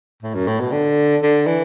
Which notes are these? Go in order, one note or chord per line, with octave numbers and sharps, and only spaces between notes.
A2
F#2
A2
B2
D3
D3
E3